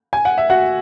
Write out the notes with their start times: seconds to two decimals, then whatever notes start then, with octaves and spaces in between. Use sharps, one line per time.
0.13 G#5
0.25 F#5
0.38 E5
0.50 F#4 F#5